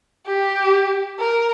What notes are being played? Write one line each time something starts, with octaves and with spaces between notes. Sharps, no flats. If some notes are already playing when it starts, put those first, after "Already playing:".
G4
A#4